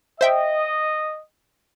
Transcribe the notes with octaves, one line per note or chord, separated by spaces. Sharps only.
C5 D#5 E5 G5